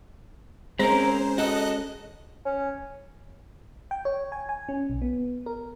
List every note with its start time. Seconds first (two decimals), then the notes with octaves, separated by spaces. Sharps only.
0.79 G#3 C4 C#4 A#4 C5 A#5
1.38 F#4 A4 D#5 F#6
2.45 C#4
3.91 G5
4.05 C#5
4.32 G#5
4.49 G#5
4.69 C#4
4.90 B1
5.02 B3
5.46 A#4